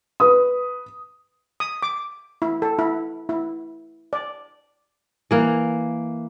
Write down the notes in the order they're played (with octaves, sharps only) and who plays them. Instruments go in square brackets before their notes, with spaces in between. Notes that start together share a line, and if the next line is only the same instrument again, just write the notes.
[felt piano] B4 D#6
[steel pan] D#6
D6
E4
A4
E4
E4
D5
[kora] E3 A#3